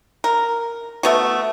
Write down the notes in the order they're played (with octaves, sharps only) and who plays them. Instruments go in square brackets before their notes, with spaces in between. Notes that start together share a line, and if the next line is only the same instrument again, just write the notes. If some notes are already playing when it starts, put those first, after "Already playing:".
[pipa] A#4
A3 B3 F#4